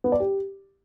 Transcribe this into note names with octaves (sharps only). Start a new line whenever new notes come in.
B3
D5
G4